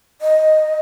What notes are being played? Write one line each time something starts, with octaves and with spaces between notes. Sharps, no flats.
D#5